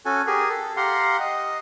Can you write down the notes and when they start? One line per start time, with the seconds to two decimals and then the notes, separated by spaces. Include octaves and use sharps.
0.06 C#4 F#4 A4 G#5
0.27 G4 G#4 A#4
0.49 A4
0.77 G4 F5 F#5 A#5 C6
1.20 D#5